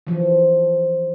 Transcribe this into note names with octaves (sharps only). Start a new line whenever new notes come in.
E3 F3